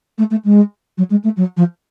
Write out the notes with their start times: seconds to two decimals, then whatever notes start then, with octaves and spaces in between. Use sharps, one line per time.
0.18 A3
0.31 A3
0.44 G#3
0.98 F#3
1.10 G#3
1.24 A3
1.37 F#3
1.57 F3